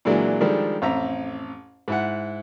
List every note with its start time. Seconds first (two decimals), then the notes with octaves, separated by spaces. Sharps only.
0.05 A#2 E3 F#3 G#3 A#3 D4
0.41 D#3 F3 G3 G#3 D4 A4
0.82 A1 F2 C5 E5 A#5
1.88 G#2 E4 F#5